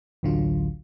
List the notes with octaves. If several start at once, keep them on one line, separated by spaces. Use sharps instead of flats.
A1 D2 D3 F#3 F4